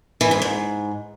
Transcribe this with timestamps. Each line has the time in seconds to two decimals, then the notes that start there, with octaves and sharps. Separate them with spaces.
0.21 E3
0.31 G#2
0.42 G#2